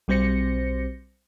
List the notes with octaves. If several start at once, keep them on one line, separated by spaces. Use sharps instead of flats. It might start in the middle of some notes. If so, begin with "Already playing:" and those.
B1 G3 C4 C5 A#6 C#7